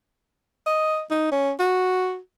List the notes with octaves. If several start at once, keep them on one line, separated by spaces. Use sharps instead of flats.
D#5
D#4
C#4
F#4